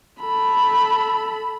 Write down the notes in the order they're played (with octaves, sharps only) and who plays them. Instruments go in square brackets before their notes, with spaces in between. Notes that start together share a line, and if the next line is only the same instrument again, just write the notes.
[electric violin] A4 B5